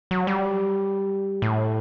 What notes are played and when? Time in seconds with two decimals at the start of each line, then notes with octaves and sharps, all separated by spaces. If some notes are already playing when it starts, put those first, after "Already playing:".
0.11 F#3
0.27 G3
1.42 A2